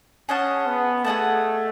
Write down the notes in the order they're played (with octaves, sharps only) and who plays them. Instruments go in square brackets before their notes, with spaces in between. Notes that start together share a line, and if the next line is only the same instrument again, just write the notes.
[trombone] C#4 [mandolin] G#4 D#5 F#5 A5
[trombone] B3
[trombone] A3 [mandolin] G#4 D#5 F#5 A5